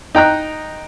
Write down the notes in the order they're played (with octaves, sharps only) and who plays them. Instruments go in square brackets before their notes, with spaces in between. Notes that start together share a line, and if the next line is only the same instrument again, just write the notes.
[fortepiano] D#4 G5 A#5 F#6